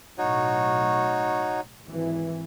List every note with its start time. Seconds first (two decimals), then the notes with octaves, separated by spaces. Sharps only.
0.18 B1 A2 D#4 F#4 C#5
1.86 G#1 E3